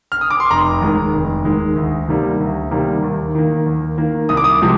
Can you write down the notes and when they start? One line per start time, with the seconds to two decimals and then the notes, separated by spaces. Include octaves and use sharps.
0.12 F6
0.21 D#6
0.30 D6
0.40 C6
0.51 F1 A#5
0.81 D#2 D#3 G#3
1.13 F1
1.45 D#2 D#3 G#3
1.76 D2
2.08 C3 D#3 G3 A#3
2.40 D2
2.71 C3 D#3 G3 A#3
3.03 D#2
3.35 D#3 A#3
3.66 D#2
3.98 D#3 A#3
4.29 C2 D#6
4.37 D6
4.44 D#6
4.62 C3 F3 G#3